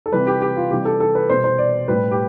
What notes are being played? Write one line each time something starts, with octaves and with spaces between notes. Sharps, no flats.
A4
C3 E3 G3 B4
G4
G4
F4
C3 E3 G3 G4
A4
A4
B4
B2 G3 C5
C5
D5
A2 G3 B4
G4